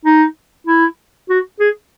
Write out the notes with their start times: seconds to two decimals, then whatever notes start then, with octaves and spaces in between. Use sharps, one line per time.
0.05 D#4
0.66 E4
1.29 F#4
1.60 G#4